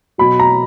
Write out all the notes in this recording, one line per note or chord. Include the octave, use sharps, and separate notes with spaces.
B2 F#3 B5
A#5